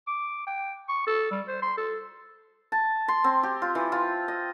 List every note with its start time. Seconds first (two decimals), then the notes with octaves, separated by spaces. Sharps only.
0.07 D6
0.47 G5
0.89 C#6
1.07 A4
1.31 G3
1.48 C5
1.62 C6
1.77 A4
2.72 A5
3.08 C6
3.24 C4
3.43 G4
3.62 F4
3.75 E3
3.92 F4
4.28 D#5